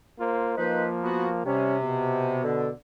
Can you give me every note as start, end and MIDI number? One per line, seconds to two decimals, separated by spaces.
0.19 0.55 58
0.19 0.55 65
0.19 0.55 72
0.57 1.44 53
0.57 1.44 58
0.57 0.86 63
0.57 0.86 71
0.57 0.86 72
1.03 1.28 59
1.03 1.28 66
1.45 2.42 48
1.45 1.76 55
1.45 1.76 61
1.81 2.71 47
2.44 2.69 50